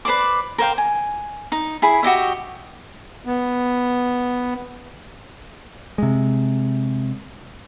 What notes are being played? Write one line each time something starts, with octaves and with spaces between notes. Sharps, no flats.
B4 C5 D5 D6
A#4 C5 F5 G5
G#5
D#4
E4 G#4 B5
F#4 G4 D#5 E5
B3
C3 G#3